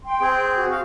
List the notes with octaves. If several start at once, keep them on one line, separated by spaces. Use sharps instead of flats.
G5 C6
C4 G#4
F#4
F5